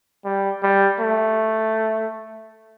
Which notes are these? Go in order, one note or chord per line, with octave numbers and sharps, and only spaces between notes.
G3
G3
A3